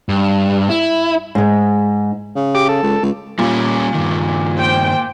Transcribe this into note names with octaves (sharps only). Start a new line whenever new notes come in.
G2
E4
G#2 G#3
C#3
G4 D6
A4
C#2
C#2
A#2 G3 C#4
G2 D#3
C5 G5